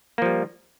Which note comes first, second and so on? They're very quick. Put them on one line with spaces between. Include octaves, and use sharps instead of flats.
A#3 F3 G3